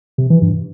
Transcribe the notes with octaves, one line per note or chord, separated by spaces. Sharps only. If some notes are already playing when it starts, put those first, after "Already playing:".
C3
E3
G2